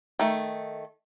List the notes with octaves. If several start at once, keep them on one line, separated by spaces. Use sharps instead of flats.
D#3 A3